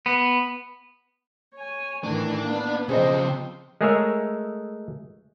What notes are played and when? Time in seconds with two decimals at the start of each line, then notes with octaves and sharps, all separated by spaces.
0.06 B3
1.55 C#5 G#5
2.04 A2 D#3 E3 D4
2.43 A#3 B3 B4
2.89 C#3 F3 C4 G#4 A4 C5 D#5 G5
3.81 G#3 A3 G#4 A#4 C#5 E5